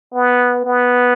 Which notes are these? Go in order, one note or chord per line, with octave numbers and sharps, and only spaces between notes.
B3
B3